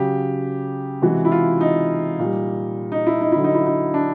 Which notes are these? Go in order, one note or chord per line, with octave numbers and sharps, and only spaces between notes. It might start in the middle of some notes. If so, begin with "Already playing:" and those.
Already playing: C#3 F#3 G4
C3 E3 G#3 F#4
E4
F4
D#4
A#2 G3
D#4
E4
D#4
D3 F#3 E4
D#4
E4
D#4
D4